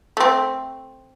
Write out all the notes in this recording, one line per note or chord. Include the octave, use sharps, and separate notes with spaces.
A3 C4